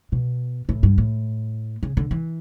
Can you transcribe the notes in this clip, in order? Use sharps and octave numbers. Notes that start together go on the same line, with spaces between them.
B2
A2
G2
A2
C#3
D3
E3